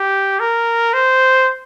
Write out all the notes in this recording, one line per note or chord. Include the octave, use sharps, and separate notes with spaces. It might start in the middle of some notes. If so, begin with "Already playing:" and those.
Already playing: G4
A#4
C5